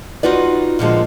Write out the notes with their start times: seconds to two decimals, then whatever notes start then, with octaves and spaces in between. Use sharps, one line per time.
0.23 D#4 F4 F#4 B4 D5
0.79 A#2 D3 F3 G#3